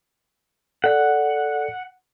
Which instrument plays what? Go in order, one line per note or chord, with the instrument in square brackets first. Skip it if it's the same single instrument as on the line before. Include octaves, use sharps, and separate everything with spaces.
[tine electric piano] A4 D5 [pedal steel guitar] F#5